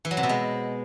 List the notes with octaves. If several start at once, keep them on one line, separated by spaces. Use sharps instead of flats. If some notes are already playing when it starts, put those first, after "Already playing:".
E3
F#3
C3
B2
G#3